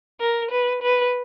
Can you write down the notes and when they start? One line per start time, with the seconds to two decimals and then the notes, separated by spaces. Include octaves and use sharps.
0.21 A#4
0.51 B4
0.82 B4